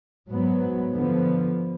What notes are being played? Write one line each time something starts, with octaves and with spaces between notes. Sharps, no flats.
G#2 F#3 B3
D3 F3 B3